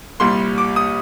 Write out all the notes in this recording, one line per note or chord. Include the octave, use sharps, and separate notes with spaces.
C2 A#2 G3 C6
D6
D#6